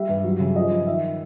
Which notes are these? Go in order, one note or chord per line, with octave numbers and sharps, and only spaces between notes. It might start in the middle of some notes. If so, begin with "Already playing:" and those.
Already playing: G3 E5
G2
F#3
C#3
F3 D#5
F3
D#3 E5